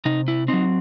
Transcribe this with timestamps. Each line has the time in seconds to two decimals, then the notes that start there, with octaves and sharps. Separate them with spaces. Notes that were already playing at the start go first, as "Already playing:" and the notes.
0.05 C3 D#4
0.28 E4
0.48 F#3 C4 D#4